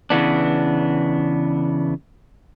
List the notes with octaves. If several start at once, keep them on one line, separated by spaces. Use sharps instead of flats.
C#3 E3 B3 D4